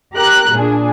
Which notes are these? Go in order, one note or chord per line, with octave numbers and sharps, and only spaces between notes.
G4 A#4 A#5 F#6
A#2 D4 G#4